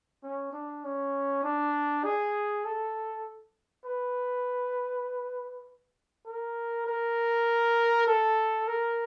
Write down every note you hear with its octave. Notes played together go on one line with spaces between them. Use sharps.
C#4
D4
C#4
D4
G#4
A4
B4
A#4
A#4
A4
A#4